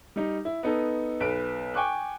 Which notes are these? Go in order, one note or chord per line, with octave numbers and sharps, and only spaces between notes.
G3 D#4
E4
B3 D#4 A4
B1 B4 D7
G5 G#5 C#6 D6 F#6